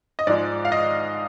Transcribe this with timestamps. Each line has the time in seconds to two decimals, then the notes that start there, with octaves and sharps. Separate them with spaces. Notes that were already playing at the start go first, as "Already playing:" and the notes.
0.19 D#5
0.27 G#2 F3 G#3 D5
0.65 F5
0.72 D#5